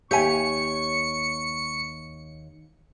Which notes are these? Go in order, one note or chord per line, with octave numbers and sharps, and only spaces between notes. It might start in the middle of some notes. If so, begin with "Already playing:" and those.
D#2 G4 C#5 E5 G#5 C#6 C#7